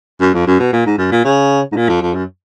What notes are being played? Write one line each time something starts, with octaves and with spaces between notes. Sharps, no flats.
F#2
F2
F#2
B2
A#2
G#2
F#2
A#2
C#3
G#2
A#2
F2
F2
F#2